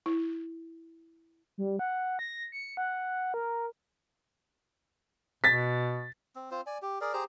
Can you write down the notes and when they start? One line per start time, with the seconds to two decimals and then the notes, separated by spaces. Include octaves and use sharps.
0.06 E4
1.58 G3
1.79 F#5
2.19 A#6
2.52 C#7
2.77 F#5
3.34 A#4
5.44 B2 A6 B6
6.35 C4
6.51 C4 F4 C5
6.66 D5 G#5
6.82 G4
7.01 G#4 A#4 D5
7.13 G4 G#4 C5 A#5